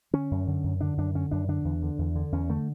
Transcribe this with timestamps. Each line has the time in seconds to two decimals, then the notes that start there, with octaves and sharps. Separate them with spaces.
0.13 D3 C#4
0.31 F#2
0.47 D3
0.64 F#2
0.81 D3 D4
0.97 F#2 D4
1.14 D3 C#4
1.31 F#2 D4
1.48 D3 D4
1.65 E2
1.83 D3
1.98 E2
2.15 D3
2.32 E2 C#4
2.49 D3 A3